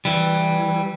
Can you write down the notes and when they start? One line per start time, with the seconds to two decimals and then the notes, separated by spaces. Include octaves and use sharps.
0.05 E3 G3